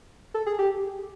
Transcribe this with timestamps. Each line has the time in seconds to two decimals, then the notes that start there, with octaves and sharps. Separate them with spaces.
0.34 A4
0.46 G#4
0.59 G4